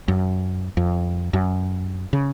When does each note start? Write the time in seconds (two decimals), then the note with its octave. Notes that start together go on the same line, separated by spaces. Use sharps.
0.08 F#2
0.77 F2
1.33 F#2
2.13 C#3